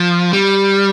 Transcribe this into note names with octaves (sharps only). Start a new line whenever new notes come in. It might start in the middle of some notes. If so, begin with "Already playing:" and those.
Already playing: F3
G3